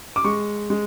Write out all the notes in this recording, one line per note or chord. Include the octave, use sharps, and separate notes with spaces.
D6
G#3 C#6
G#3